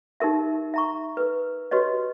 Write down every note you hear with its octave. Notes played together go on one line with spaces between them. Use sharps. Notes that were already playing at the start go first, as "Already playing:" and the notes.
D#4 G4 A#4 E5
E5 A#5 C#6
A#4 B4
F#4 G4 B4 C#5 D#5